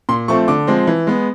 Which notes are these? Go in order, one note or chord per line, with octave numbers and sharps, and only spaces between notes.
A#2 C6
F3 A3 C4 C#6
D3 D6
F3 G#3 C4
E3
G#3 B3